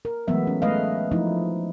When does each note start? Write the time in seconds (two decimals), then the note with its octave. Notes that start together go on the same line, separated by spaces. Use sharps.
0.05 A#4
0.28 E3 F#3 G#3 A3 B3 E5
0.47 C#4
0.62 G#3 A3 B4 D#5 F5
1.11 F3 A3 D#4 E4